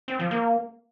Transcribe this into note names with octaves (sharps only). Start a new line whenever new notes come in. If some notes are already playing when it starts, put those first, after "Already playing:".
C4
F3
A#3